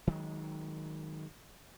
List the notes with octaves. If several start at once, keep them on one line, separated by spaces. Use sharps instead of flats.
D#3 F#3 G#3